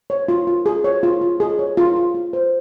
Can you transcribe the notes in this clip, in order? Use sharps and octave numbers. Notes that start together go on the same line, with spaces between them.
C#5
F4
F4
G#4
C#5
F4
F4
G#4
C#5
F4
F4
F4
C5